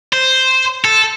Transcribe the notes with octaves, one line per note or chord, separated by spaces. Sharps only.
C5
A4